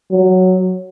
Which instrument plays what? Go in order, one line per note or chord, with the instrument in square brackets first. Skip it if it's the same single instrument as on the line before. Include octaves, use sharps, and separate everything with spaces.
[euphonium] F#3